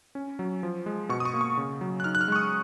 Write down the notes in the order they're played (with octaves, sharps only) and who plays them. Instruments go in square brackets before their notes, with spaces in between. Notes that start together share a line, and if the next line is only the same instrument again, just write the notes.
[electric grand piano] C#4
F#3
F3
G#3
B2 C#6
D#6
C#6
A#3
C#6
C#3
F#3
F#6
D#4 F6
F#6
F6
G#3 C#6
D#6